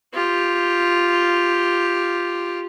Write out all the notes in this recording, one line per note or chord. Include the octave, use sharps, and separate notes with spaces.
F4 G4